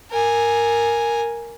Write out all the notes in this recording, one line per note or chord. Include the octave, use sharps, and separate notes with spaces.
A#4 G#5